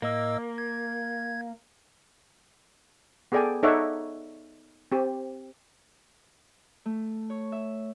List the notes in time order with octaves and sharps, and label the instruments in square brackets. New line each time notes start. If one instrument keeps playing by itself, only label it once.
[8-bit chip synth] A2 D#5 E6 [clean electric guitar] A#3
[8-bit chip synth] G#6
[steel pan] B3 G#4 A4 D5 G5 G#5
D#4 A4 C#5 D5 E5 F#5
C4 G4
[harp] A3
C#5
E5